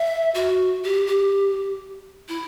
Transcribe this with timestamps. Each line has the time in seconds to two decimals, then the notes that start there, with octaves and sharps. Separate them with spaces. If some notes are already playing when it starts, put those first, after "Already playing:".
Already playing: E5
0.34 F#4
0.83 G4
1.07 G4
2.28 E4